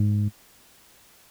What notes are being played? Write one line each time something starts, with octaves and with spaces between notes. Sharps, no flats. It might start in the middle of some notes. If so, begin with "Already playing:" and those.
Already playing: G#2